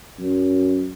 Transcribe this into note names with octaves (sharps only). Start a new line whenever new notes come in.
F#2